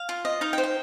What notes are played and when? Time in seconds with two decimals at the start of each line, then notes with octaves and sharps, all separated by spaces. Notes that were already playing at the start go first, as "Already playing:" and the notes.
Already playing: F5
0.09 F4
0.25 D#5
0.41 D#4 F5
0.53 G5
0.58 C5
0.64 G5